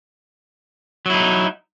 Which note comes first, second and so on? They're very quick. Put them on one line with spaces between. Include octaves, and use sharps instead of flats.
F#3 E4 D#4